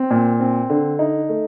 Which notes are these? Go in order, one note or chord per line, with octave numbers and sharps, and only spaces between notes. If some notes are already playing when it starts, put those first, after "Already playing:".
Already playing: C4
A#2
C4
D3
D#4
A3